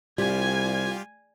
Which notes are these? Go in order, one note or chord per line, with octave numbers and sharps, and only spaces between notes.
C2 G3 F4 G4 G#5 G#6